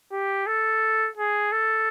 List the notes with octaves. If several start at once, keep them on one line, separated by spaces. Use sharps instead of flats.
G4
A4
G#4
A4